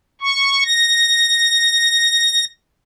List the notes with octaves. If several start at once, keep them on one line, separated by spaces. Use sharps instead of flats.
C#6
A#6